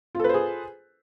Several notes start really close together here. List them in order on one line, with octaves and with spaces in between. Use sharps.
F4 A4 B4 C5 G#4